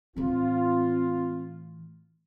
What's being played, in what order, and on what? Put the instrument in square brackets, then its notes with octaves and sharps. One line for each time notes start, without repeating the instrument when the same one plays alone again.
[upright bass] A2 E3 [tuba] C4 [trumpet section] F4